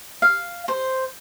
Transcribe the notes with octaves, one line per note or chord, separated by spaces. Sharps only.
F5
C5